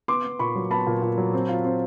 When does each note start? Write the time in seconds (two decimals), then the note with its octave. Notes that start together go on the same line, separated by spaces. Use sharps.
0.08 B3 C6 D6
0.24 B3
0.39 A#2 B5 C#6
0.55 F#3
0.71 B3 A5 B5
0.87 A#2
1.02 A#2
1.18 F#3
1.33 C4
1.49 F4
1.65 C4